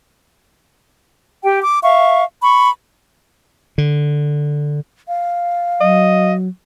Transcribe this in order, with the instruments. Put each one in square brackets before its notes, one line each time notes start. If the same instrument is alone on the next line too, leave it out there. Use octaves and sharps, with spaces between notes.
[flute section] G4 G5
D6
E5 F5 C#6
B5 C#6
[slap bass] D3
[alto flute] F5
[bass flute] F#3 [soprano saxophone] D#5